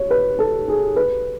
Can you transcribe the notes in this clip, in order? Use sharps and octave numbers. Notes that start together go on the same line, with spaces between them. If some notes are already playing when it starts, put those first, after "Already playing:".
Already playing: C#5
B4
A4
G#4
B4